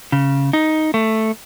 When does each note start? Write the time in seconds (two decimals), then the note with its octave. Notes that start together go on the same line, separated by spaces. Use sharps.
0.12 C#3
0.53 D#4
0.94 A3